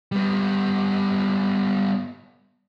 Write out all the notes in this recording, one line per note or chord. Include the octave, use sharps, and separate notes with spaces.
G3 B3